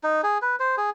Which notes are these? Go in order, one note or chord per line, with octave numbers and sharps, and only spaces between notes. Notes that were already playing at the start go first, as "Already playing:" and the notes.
D#4
G#4
B4
C5
G#4